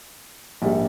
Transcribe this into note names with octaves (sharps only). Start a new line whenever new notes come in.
A#1 G#2 G3 A#3